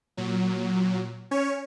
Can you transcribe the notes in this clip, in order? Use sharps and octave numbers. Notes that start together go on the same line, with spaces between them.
A#2 F#3
C#4 C#5